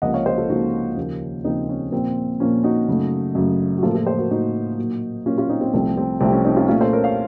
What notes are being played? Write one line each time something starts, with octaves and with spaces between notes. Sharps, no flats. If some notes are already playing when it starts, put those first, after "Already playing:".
C#2 C3 F3 A#3 D#5 F#5
C#5 F5
C5 D#5
F4 A4
C#2 C3 F3 A#3 D#4 F#4
D#2 C#3 F3 A#3
D#2 C#3 F3 A#3 C4 D#4
C#4
A#2 F3 A#3 C4
A#2 F3 A#3 C#4
D#4 F#4
F#2 C#3 A3
F#2 C#3 A3
F#4
A2 F3 A#3 F4 A4
F4 A4
A4 C5
F#4 A#4
A2 F3 A#3 D#4 F#4
A#2 F#3 A#3
A#2 F#3 A#3 C#4 F4
C#4 F4
C4 D#4
C4
C2 C3 F3 A3 C4
C4
C2 C3 F3 A3 C4
C#4
C4 D#4
C#4 F4
A#2 A3 C#4 F4
A4 C5
A#4 C#5
C#5 F5